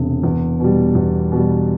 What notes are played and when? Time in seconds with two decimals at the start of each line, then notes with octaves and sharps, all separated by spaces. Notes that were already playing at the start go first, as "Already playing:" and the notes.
Already playing: E1 C3
0.23 E2
0.60 B2 G3
0.95 E2
1.32 B2 G3